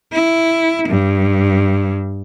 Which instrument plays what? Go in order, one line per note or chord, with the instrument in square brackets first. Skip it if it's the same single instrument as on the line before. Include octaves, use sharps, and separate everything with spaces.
[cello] E4
G2